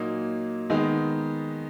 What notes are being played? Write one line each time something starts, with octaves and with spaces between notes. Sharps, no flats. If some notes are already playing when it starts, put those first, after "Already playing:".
Already playing: A#2 F#3 A#3 D#4
D#3 G#3 B3 D#4